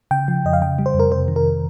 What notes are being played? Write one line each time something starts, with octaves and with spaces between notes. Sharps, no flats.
C#3 G5
F3
F2 D#5
F5
C#3 G5
G3
C5
F2
A#4
C3 C5
D#3
A#4